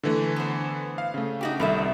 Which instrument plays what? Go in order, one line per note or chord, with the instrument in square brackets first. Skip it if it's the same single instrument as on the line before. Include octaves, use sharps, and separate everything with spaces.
[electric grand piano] D3 E3 A3
[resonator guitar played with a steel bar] B3 C5
[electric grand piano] F5
C#3 A3
[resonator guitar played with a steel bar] D#4 F#4 G4
[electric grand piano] C2 D#3 [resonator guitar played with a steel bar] B3 A4 E5